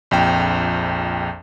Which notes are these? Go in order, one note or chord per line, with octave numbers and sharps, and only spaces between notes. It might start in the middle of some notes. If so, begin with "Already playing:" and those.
A#1 F2 G5